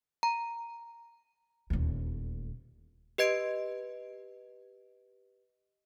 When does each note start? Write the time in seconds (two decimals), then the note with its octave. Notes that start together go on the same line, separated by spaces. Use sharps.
0.23 A#5
1.70 D#1 D2
3.18 G4 B4 D#5 G#6 D7